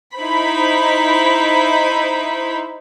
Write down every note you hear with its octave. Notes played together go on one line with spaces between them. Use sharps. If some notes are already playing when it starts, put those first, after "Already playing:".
D#4 E4 C5 B5